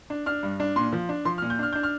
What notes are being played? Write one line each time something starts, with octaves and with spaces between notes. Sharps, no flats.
D4
D4 F6
G2
D4
A#2 C6
F3
D4
F3 C6
F6
A#2
G6
D4 F6
D4 G6
F6